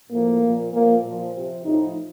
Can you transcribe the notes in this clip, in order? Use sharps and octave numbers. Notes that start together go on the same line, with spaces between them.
A2 F3 A#3
A#2 F3
A#2 F3 A#3
A#2 F3
C3 F3
A2 F3 D#4